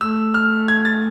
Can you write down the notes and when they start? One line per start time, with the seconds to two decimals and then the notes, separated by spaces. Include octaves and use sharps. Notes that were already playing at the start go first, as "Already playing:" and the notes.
0.01 A3 E6
0.34 F6
0.68 G#6
0.85 A6